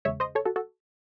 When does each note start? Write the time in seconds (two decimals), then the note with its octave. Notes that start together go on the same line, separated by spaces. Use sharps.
0.05 E2 C#3 G#3 C#5 E5
0.20 C5 D#5
0.35 A4 C#5
0.45 F#4 A4
0.56 F#4 A4